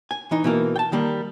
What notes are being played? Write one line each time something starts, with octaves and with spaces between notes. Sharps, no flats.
G#5
E3 D#4
B2 E3 A#3
G5 A5
D#3 G3 A#3